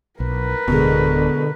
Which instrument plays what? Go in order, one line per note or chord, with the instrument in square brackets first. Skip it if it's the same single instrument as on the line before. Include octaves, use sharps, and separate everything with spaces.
[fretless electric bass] B1 [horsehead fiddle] A#4 B4
[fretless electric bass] D1 [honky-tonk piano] B2 G#3 [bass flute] D3